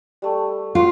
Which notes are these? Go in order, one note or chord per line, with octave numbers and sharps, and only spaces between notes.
G3 A3
F4 F#4 C5